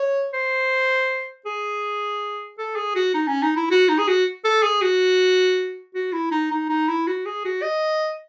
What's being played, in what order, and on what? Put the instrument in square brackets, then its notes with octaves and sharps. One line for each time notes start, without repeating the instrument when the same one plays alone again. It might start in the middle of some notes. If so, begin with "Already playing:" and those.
Already playing: [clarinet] C#5
C5
G#4
A4
G#4
F#4
D#4
C#4
D#4
E4
F#4
D#4
G#4
F#4
A4
G#4
F#4
F#4
E4
D#4
D#4
D#4
E4
F#4
G#4
F#4
D#5